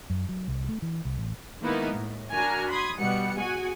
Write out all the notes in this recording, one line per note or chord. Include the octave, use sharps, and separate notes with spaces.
F#2
F#3
C2
A3
E3
C2
A1
D#3 G#3 A#3 B3 D#4 E4
A2
D4 F#4 A#4 G#5 A#5 F6
B5 C6 D#6 G#6
B2 G3 B3 F#5 C#7
F#4 G#4 F#5 G#5